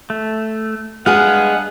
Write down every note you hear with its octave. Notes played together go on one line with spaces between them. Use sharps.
A3
G2 G#3 B3 G#4 F5 F#5